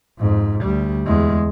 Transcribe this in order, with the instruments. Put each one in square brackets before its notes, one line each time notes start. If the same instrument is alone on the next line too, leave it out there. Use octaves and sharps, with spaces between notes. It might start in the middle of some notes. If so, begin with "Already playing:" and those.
[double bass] F2 G#2
D2 G3
E2 G#3